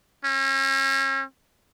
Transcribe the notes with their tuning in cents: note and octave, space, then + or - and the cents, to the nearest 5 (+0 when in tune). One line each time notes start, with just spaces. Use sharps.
C#4 -40